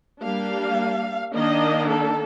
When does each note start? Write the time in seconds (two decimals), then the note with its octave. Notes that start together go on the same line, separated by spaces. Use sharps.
0.22 G3 A#3 D4 F5
1.34 D#3 A#3 D4 D#5
1.90 A4